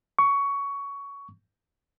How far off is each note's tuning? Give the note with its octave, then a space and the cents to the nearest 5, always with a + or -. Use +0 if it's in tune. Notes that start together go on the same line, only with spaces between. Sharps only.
C#6 +15